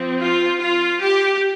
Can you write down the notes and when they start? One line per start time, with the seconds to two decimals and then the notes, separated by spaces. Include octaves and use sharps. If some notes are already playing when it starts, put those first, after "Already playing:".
Already playing: F3 C4
0.21 F4
0.61 F4
1.01 G4